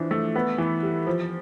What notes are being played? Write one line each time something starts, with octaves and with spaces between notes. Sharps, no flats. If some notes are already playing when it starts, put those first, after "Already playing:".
Already playing: E3 F3 D4
A3
B3
E3
G3
F3